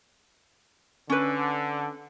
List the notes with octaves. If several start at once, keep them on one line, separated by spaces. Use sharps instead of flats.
D3 C#4 B4